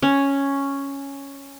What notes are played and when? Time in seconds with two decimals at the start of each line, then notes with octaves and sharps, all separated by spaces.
0.02 C#4